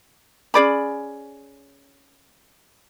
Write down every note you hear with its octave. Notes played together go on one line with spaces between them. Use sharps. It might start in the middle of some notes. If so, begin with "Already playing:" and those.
C#4 G#4 D5 B5